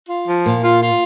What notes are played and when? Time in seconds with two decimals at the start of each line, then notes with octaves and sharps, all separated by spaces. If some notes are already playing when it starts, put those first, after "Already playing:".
0.09 F4
0.28 F3
0.45 A#2 F4
0.63 F4
0.82 F4